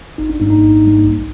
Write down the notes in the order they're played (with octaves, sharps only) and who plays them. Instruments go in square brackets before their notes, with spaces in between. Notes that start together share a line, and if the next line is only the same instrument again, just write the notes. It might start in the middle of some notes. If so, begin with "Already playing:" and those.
[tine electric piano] G#1 D#4
D4
G#2 G3 A#3 D#4
D#4
G#1
G#2 G3 A#3
C2